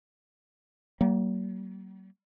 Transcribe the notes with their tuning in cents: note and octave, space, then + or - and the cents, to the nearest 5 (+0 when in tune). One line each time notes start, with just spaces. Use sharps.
F#3 +45 A#3 +0